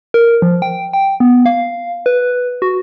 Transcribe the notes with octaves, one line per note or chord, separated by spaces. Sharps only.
A#4
F3
G5
G5
B3
F5
B4
F#4